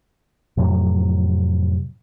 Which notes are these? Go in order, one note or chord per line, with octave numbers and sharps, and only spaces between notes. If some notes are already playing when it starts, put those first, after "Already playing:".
F2 A2 C3 F#3